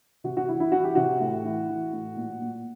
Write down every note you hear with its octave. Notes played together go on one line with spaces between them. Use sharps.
C3 F#4
F#4
E3 E4
E4
E3 F#4
G4
C3 F#4
A2
E3
E3
A2
A#2
A#2